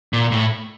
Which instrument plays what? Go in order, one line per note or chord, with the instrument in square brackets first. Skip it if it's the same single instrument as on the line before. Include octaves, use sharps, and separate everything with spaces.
[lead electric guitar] A#2
A2